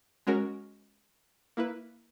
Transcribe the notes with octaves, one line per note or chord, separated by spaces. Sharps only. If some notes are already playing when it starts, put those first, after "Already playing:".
G#3 C#4 F#4 A#4
A#3 E4 B4